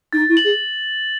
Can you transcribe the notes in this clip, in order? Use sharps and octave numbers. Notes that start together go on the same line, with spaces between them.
D#4 A6
E4
F#7
G#4